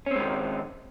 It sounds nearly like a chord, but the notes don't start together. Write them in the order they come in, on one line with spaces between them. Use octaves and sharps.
C#4 C4 G#3 D#3